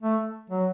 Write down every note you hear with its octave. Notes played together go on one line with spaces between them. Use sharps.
A3
F#3